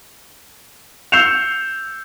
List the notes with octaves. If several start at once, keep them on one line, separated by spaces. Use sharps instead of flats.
E6 G6 C7 C#7 E7 F7